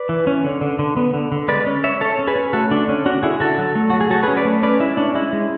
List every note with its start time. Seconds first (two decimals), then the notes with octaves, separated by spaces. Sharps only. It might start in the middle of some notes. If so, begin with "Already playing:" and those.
Already playing: B4 D5
0.09 E3
0.27 C#4
0.44 D3
0.61 D3
0.79 D3
0.97 B3
1.14 D3
1.32 D3
1.48 G#3 B4 D5
1.66 C#4
1.84 G#3 C#5 E5
2.01 C#4 A4 C#5
2.19 C#4
2.27 G#4 B4
2.36 C#4
2.53 A3 F#4 A4
2.71 D3 D4
2.89 C#4
3.06 C#4 D4 F#4
3.23 D3 E4 G#4
3.40 D3 F#4 A4
3.58 F#3
3.75 A3
3.90 A3 F#4
4.01 G#4
4.10 F#3 F#4 A4
4.23 C#4 G#4 B4
4.37 B4 D5
4.45 A3
4.63 C#4 B4 D5
4.80 G#3 E4
4.97 C#4 D4
5.15 G#3 E4
5.33 G#3